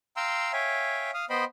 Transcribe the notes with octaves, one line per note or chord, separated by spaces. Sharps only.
F5 G5 A#5 C6 E6
C#5 E5 F5 G5 G#5
F5 D#6 F6
B3 C5 D#5 G5 B5 C6